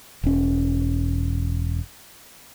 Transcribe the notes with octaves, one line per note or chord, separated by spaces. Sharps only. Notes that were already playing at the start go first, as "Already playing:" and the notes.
E1 C#4